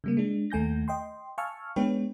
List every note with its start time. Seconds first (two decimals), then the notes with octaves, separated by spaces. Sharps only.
0.04 C#3 G3 A#3
0.17 G#3 D4
0.50 D#2 A3 G#5 G6 A#6
0.88 D#5 G5 C6
1.38 F5 G#5 A5 C#6 E6 F6
1.76 G#3 B3 D4 B4 C#5 G5